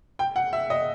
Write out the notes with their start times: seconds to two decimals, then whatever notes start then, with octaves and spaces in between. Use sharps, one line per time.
0.19 G5
0.36 F#5
0.53 E5
0.70 D#5